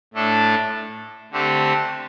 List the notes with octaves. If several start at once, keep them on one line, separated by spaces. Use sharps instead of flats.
A2 A3 D4 A4
D3 A3 C4 G4